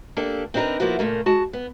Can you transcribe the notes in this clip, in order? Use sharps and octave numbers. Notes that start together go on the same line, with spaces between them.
A#3 D4 G4 A4
C4 D4 D#4 F#4 A#4 B4
F3 A#3 B3 E4 F#4
A#2 C#3 A3 A#3
G#3 F#4 A5
B3